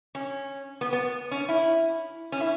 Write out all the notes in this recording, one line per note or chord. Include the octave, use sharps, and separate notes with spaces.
C#4
B3
B3
C#4
E4
C#4
E4